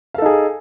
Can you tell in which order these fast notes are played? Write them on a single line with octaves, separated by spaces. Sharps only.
F5 A4 D#4 G#4